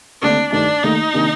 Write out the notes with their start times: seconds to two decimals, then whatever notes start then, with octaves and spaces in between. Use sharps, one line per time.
0.22 D#2 D3 A3 C4 D4
0.52 G2 D#3 A3 D4 D#4
0.83 D#2 D#3 A3 D#4
1.14 C3 D#3 A#3 D4